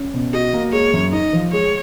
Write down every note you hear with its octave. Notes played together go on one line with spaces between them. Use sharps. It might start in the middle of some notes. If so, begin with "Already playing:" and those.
Already playing: C#4
B2
F#4 D#5
A#3
G#3 C#5
F#2
D#4 D#5
F3
G#3 C#5